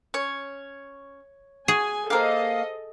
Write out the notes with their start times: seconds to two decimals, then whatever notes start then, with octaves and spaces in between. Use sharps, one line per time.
0.14 C#4 C#5
1.68 F#4 G#4 G#5
2.10 A#3 G4 A4 A#4 C5 D#5 F5